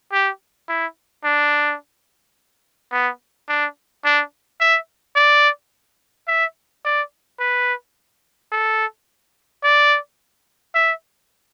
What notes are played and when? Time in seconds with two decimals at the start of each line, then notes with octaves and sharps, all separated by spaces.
0.12 G4
0.69 E4
1.24 D4
2.92 B3
3.49 D4
4.05 D4
4.60 E5
5.16 D5
6.28 E5
6.85 D5
7.40 B4
8.52 A4
9.64 D5
10.75 E5